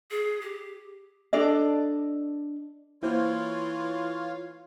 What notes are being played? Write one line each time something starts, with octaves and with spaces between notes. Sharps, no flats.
G#4
G4
D4 A4 D5 D#5
E3 A#3 E4 F4 C5 C#5 F5